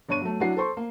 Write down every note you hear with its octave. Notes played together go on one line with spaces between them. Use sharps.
G1 D4 C#5 C#6 D#7
F#3 A3
F#3 D4 E4 F#4 C7
A4 C5 C6 C#6
A#3